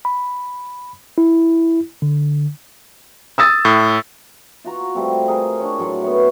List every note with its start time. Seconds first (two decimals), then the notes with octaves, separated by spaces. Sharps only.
0.05 B5
1.18 E4
2.02 D3
3.38 D#6 E6 A6
3.65 A2
4.64 F4 F#4 A#5
4.95 G3 A3 C4
5.28 G#4 A#4 C5
5.59 D4 C#5
5.78 A2 F#3 D4 C6
6.02 B3 C#5 E5